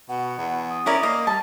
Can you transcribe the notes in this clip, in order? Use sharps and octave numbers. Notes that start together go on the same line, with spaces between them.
B2 F#5
E2
D#6
C#4 E4 A#4 D5
A#3 D#5
G3 A5